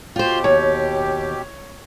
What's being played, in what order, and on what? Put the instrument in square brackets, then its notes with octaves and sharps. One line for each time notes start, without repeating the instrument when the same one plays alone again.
[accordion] B2 G4 [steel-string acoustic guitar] F4 C5
[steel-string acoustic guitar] D#2 [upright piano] C#5